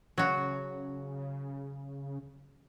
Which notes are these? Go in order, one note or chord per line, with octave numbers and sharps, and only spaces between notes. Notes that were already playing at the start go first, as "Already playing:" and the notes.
C#3 F#3 F#4